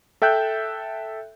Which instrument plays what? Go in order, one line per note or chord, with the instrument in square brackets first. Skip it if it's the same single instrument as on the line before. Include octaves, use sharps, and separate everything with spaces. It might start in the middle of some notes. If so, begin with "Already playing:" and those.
[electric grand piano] A4 E5 G5 F#6 G6